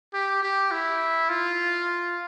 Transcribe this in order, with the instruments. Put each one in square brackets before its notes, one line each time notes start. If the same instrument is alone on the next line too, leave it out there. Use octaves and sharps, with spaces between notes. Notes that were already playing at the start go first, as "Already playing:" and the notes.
[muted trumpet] G4
G4
E4
F4